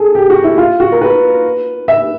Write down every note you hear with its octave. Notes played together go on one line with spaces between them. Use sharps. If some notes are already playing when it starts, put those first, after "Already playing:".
Already playing: G#4 A4
G4
F#4
E4
F4
F#4
A#4
B4
E5